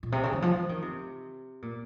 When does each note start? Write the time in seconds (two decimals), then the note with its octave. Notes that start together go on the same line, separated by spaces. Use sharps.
0.03 A#2
0.12 C3
0.23 C#3
0.33 D#3
0.42 F3
0.57 F3
0.69 D#3
0.82 C3
1.62 A#2